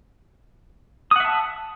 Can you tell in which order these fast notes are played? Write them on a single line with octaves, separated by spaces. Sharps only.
D#6 F#5 E5 A5